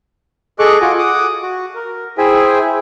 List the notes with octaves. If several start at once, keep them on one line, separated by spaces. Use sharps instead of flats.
G#4 A4 D#5 C#6 D6 F#6
F4 F#4 F#5 G#5 D6
F#5 D6 D#6
F#4
A#4
E4 G#4 C5 E5 G5 G#5